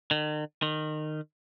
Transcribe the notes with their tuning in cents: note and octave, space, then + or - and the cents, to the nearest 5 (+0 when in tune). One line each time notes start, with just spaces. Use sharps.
D#3 -40
D#3 -20